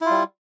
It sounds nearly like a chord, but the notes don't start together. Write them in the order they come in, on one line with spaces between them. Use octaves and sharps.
E4 F4 G3